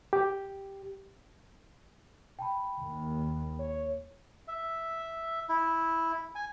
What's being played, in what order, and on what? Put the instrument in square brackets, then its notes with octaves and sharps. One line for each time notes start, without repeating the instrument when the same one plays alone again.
[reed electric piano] G4
[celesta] G5 A5 B5
[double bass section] D#2
[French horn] C#5
[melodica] E5
E4
G#5